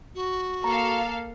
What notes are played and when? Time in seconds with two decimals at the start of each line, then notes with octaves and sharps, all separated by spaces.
0.15 F#4
0.64 A#3 A4 F5 A#5